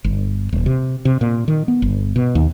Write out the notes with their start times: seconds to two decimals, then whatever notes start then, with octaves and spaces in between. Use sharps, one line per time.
0.04 G1
0.53 D#1
0.66 C3
1.05 C3
1.21 A#2
1.48 D#3
1.68 B3
1.82 G1
2.16 B2
2.35 D#2